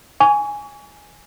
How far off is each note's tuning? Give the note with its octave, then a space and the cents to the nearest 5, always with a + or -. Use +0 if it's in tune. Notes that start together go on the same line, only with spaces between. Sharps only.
G#5 +0 C#6 +35